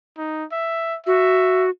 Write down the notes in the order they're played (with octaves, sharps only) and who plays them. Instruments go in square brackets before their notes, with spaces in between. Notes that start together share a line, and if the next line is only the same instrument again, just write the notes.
[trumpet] D#4
E5
[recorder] F#4 [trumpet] E5